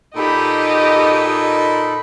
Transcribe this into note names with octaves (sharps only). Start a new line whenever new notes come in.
A#2 D#4 G4 A4 D#5 B5